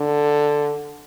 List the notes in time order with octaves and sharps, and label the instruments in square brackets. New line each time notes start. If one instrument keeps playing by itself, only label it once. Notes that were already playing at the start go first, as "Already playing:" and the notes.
Already playing: [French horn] D3